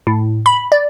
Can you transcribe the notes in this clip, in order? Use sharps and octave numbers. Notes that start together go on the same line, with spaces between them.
A2
B5
D5